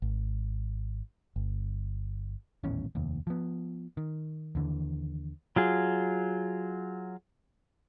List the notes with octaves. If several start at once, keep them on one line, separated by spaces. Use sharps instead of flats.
G#1
G1
D#1 A1 E2 C#4
F1 D#2
F3 B3
D#3
D#2 D3 E3
F#3 F4 G#4